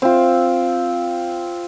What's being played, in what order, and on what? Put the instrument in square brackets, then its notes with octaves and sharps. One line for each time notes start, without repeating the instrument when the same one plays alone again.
[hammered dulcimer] C4 F4